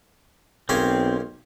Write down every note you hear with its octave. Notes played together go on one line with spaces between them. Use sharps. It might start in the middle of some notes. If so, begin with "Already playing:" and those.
B1 A#3 C4 C#4 G#4